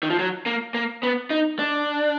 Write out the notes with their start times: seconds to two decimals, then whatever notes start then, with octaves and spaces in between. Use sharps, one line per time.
0.03 D#3
0.10 F3
0.19 F#3
0.46 A#3
0.74 A#3
1.03 B3
1.30 D#4
1.59 D4